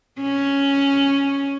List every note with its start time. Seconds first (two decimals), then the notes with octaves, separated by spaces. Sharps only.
0.21 C#4